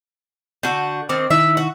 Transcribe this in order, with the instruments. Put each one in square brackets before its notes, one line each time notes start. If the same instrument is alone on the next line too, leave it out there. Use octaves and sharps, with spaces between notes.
[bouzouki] D3 F#4 [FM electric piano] G6
[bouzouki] D#3 C4 [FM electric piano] D6 A6
[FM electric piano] D#3 D#4 E4 [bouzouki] E5
[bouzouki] F#4